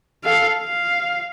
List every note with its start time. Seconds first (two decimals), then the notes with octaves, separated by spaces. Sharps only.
0.24 A4 F5
0.58 F5